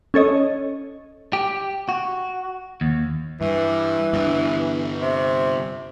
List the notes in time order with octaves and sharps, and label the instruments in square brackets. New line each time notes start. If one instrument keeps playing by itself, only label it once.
[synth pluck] C#4 A4 C#5 D#5
[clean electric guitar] G4
F#4
D#2
[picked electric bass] G2 [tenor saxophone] E3
[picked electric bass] G2 D3
[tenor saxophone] C3